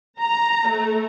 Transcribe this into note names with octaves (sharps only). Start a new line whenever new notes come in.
A#5
A3